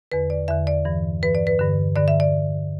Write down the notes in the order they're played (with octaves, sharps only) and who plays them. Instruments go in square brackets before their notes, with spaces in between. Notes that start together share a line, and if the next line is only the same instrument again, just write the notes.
[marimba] E2 D3 B4
D5
E2 D3 E5
D5
G2 E3
G2 E3 B4
D5
B4
G2 D3
G2 D3 D5
E5
D5